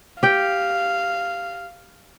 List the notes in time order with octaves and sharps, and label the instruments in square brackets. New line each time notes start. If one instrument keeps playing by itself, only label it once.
[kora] G4 G5 [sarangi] F5